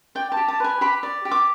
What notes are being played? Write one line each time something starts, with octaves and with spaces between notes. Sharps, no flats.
D5 G5
A5
G4
A5
B4 G#5
G4 B5
D5
G4
D6